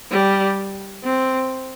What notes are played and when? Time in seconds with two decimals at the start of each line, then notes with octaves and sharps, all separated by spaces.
0.11 G3
1.03 C4